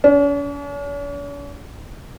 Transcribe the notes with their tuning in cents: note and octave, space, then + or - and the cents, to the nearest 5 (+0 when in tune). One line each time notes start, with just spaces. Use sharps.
C#4 +45